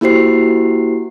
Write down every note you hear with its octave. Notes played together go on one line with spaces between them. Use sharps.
A#3 E4 F#4 G4 C5 C7